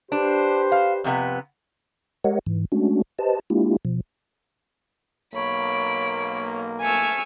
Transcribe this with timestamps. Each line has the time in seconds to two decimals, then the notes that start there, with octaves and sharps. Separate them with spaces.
0.12 D4 G4 B4 C5
0.72 F5
1.04 F2 C3 B3
2.24 G#3 G4 A#4 C#5 D#5 F#5
2.47 G#2 E3
2.72 G#3 A3 C#4 D4 F#4
3.19 G4 B4 C5 D#5 A5
3.50 G#3 A#3 D4 E4 F4 G4
3.85 B2 F3
5.34 B1 A#3 C#5 B5 D7
6.82 A3 G#5 C#6 E6 F6